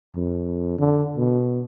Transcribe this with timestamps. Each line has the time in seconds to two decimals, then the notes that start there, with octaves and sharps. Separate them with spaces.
0.16 F2
0.79 D3
1.17 B2